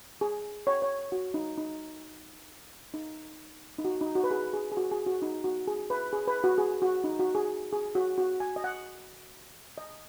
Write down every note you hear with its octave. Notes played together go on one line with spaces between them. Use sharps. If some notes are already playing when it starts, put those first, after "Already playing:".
G#4
C#5
C#5
F#4
D#4
D#4
D#4
D#4
F#4
D#4
F#4
B4
G#4
G#4
G#4
F#4
G#4
F#4
D#4
F#4
G#4
B4
G#4
B4
F#4
G#4
F#4
D#4
F#4
G#4
G#4
F#4
F#4
G#5
D#5
F#5
D#5